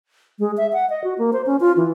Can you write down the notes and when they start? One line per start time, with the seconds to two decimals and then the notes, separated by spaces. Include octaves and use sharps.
0.39 G#3
0.57 E5
0.73 F#5
0.90 D#5
1.04 F#4
1.18 A#3
1.33 C5
1.46 C#4
1.60 F4
1.77 E3